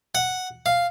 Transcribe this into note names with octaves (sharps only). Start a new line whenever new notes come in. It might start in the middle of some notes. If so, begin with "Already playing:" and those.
F#5
F5